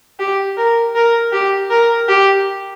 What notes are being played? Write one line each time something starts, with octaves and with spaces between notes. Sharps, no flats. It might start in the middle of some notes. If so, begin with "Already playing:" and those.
G4
A#4
A#4
G4
A#4
G4